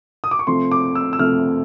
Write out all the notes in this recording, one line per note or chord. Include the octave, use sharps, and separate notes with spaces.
D#6
D6
C#6
C3 F3 A3 C4 C6
D6
E6
E6
C3 F3 A3 C4 F6